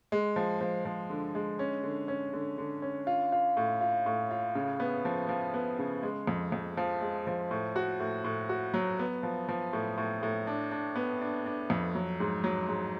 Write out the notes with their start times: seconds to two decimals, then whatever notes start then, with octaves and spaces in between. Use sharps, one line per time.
0.12 G#3
0.36 F3
0.61 F3
0.85 F3
1.10 D3
1.35 G#3
1.59 C#4
1.84 D3
2.08 C#4
2.33 D3
2.58 D3
2.82 C#4
3.07 F4
3.32 F4
3.57 A2
3.81 F4
4.06 A2
4.31 F4
4.55 C#3
4.80 B3
5.05 F3
5.29 F3
5.54 B3
5.79 C#3
6.03 G#3
6.27 F2
6.52 F2
6.77 F3
7.02 G#3
7.27 F3
7.51 A2
7.76 F#4
8.00 A2
8.24 A2
8.49 F#4
8.74 F#3
8.99 B3
9.23 F3
9.49 F3
9.73 A2
9.98 A2
10.23 A2
10.47 D4
10.71 D4
10.96 B3
11.21 D4
11.46 D4
11.70 F2
11.95 F#3
12.20 G#2
12.44 F#3
12.68 G#2